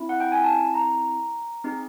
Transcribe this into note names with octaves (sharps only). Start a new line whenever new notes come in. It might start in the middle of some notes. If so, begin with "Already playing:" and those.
Already playing: C4 E4
F#5
G5
G#5
A5
A#5
C4 D#4 G#4